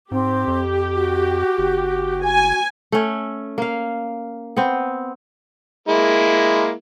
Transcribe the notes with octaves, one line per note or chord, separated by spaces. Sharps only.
G#2 C4 G4
F2
F#4
F#1
G#5
A3 C#4
A#3 F5
B3 C4
G#3 A#3 E4